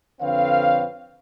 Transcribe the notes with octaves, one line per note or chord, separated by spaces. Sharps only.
F2 D3 C4 B4 C#5 F5